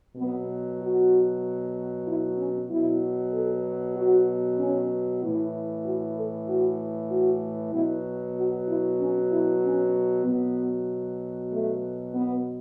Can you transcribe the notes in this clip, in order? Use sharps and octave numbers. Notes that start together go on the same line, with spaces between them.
B2 F#3 B3
F#4
E4
C#4
B2 F#3 E4
A4
F#4
C#4
A2 E3 E4
F#4
A4
F#4
F#4
B2 F#3 E4
F#4
E4
C#4
E4
C#4
B2 F#3 B3
A3
B3